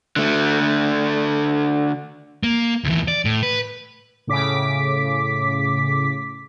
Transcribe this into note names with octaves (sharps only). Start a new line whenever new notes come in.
D3 A3
A#3
D2 E3
D5
A2
B4
A2 C#3 D6 B6